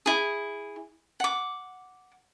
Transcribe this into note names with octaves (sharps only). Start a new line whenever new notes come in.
E4 G#4
F#5 D6